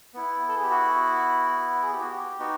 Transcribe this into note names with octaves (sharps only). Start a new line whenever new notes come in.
B3 E4
A4
G#4
G4
F#4
G#4
G4
F#4
G4
B3 D#4 F#4